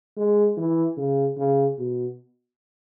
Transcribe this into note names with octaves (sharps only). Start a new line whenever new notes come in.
G#3
E3
C#3
C#3
B2